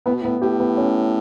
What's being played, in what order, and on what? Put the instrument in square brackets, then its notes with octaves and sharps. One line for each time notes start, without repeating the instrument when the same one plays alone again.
[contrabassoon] A2 [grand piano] B3
[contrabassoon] B2
[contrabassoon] A2 [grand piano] B3
[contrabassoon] A2 [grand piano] G4
[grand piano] B3
C#4